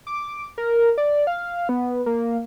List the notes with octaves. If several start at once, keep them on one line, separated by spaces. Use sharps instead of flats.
D6
A#4
D5
F5
B3
A#3